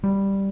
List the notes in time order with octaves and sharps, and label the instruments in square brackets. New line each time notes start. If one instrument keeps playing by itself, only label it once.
[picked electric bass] G3